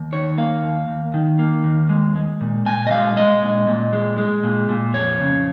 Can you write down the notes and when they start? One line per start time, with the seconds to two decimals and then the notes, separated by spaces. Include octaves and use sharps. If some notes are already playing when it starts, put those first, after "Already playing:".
Already playing: D#2
0.12 D#3 C#5
0.38 A#3 F5
0.63 D#2
0.88 D#2
1.14 D#3
1.39 A#3
1.64 D#2
1.89 G#3
2.16 G#3
2.41 A#2
2.66 A#2 G#5
2.87 D#5
2.91 G#3 F5
3.16 G#3 D#5
3.42 A#2
3.67 A#2
3.93 G#3
4.18 G#3
4.43 A#2
4.69 A#2
4.94 F2 C#5
5.20 C#3